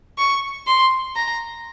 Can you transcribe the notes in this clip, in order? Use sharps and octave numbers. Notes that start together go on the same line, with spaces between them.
C#6
C6
A#5